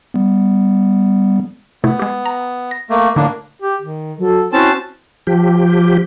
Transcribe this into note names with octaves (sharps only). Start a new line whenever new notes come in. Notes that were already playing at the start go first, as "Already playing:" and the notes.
G3 B3
C3 A3 B3 E4
G#3 G4
A#5
A#6
A3 A#3
A2 D3 A#3 D4 D#4
G4
D#3
F#3 A4
C4 C#4 E4 F#4 A5
F3 G4